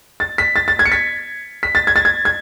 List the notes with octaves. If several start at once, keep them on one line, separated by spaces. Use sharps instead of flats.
A6
B6
A6
A6
G#6
C#7
B6
B6
A6
G#6
A6
G#6
G#6